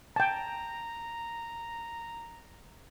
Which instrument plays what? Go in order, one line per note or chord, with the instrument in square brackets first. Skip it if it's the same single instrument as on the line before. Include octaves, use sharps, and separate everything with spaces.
[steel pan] G5 A5 [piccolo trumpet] A#5